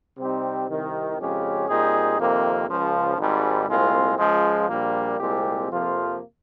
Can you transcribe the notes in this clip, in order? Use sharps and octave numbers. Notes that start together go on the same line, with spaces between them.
C3 G3 C4 D#4 G4
C2 C3 D#3
F2 C#3 G#3 C#4 G4
A#2 G3 C4 D#4 G#4
F2 C3 D#3 A#3
C#2 C#3 F3
G#1 G#2 G3
C2 A#2 G#3 C4 F4
C#2 C#3 F3 G#3
A#1 A#2 G3 A#3
C2 A#2 G#3 C4 G4
F2 C3 F3 A#3 F4